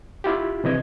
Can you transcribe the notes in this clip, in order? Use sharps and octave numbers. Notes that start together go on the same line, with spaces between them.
E4 F4 G4
C3 E3 D#5 G#6